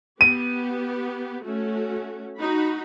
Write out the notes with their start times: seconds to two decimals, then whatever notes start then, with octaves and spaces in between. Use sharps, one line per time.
0.21 B3 G4 D#7
1.44 A3 C#4 F#4
2.39 D#4 F#4 B5